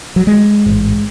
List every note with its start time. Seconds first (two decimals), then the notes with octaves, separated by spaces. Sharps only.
0.16 F#3
0.27 G#3
0.66 A1 G#2